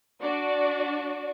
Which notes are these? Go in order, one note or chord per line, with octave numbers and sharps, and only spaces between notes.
D4 F#4 D5